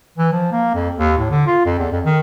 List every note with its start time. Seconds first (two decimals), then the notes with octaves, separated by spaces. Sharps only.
0.18 E3
0.32 F3
0.52 A#3
0.74 F2
0.96 D#2
1.18 A2
1.30 D3
1.47 F4
1.65 F2
1.79 E2
1.92 F2
2.05 D#3